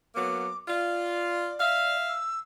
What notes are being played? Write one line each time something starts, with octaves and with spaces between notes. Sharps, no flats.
F#3 A#3 B3 D6
F4 D5
E5 F5
E6